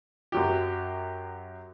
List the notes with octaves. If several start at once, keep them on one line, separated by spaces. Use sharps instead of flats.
F#2 F#3 G4